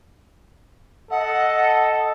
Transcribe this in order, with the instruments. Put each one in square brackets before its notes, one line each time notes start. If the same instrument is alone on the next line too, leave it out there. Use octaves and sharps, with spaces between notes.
[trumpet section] A4 D#5 [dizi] F#5